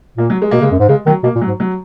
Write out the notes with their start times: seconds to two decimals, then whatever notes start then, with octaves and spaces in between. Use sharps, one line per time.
0.17 A#2 A#3
0.30 F#3
0.42 G#3
0.51 B2 A#3
0.61 C#3 G#3
0.71 F#2
0.79 G#2
0.89 C#3 G#3
1.06 D#3 F#3
1.23 B2 A#3
1.36 A#2
1.41 F#3
1.48 G#2
1.60 F#3